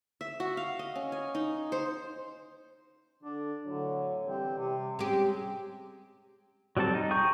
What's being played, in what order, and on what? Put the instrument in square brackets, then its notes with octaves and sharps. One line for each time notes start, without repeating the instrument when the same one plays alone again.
[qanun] E5
F#4
F5
D#5
C#4
G#5
D#4
C5
[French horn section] D3 [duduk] D4
[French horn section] A2 F#3 C#5 [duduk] D3
[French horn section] E3 G3 [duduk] C4
[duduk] C3
[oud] G#3 G4 [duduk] C4 [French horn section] C#4
[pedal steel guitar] F#3 G3 C4 A4 A5
D#4
G#4 G5 A#5 C#6 G6